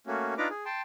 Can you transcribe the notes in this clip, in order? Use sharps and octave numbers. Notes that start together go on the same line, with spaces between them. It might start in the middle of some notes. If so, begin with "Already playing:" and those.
A3 A#3 C#4 F#4
D4 D#4 F4 B4 A#5 D6
G#4
G5 A5 C6